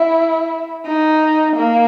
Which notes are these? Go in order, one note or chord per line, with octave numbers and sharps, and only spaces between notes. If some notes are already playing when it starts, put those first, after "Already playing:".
Already playing: E4
D#4
A#3